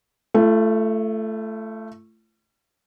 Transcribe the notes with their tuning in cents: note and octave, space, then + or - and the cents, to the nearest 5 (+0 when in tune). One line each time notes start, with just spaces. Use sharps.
A3 +0 F4 -45